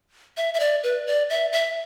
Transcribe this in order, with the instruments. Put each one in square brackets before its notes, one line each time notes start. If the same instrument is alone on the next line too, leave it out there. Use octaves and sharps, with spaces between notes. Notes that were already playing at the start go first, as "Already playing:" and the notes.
[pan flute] E5
E5
D5
B4
D5
E5
E5